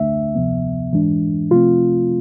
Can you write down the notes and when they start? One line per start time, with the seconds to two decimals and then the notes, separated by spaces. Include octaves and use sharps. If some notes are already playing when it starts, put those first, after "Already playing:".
Already playing: D2 D3 A3 D4 E5
0.35 D2 C3 F3 B3
0.93 G#2 E3 G#3 D4
1.51 C3 F3 A3 C4 F4